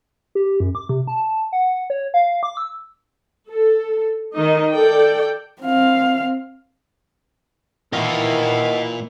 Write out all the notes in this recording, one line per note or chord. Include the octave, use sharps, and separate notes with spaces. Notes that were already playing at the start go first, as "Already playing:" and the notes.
G4
F#2
D6
C3
A5
F#5
C#5
F5
D6
E6
A4
D#3 D#4 D#5
A4 D5 G5
C4 F5
D#3 E3 A#3 E4 F4 D#5 F#5